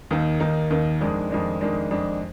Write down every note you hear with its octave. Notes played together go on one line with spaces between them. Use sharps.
D#2 D#3 A#3 D#4
D#2 D#3 A#3 D#4
D#2 D#3 A#3 D#4
F2 D#3 G#3 D4
F2 D#3 G#3 D4
F2 D#3 G#3 D4
F2 D#3 G#3 D4